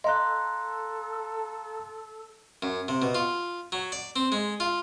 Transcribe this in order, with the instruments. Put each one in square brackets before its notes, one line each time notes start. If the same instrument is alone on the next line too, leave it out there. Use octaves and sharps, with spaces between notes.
[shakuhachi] A4 [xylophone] D#5 [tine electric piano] F5 A#5 [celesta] C6 F#6
[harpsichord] F#2
C3
B2
F4
F#3
D5
C4
G#3
F4